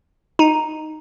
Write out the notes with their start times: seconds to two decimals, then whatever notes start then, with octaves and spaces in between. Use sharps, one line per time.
0.39 D#4